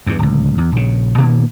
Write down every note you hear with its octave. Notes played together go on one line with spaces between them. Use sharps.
E2 G2
D1 C#2
E2
A#1 C#3
A#2 D#3 A#3 B3